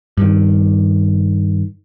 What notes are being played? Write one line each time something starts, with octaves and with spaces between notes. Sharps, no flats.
G2 D#3